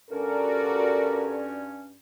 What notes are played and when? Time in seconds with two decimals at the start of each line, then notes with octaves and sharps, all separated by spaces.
0.11 G2 C#4 F#4 A4 A#4 D5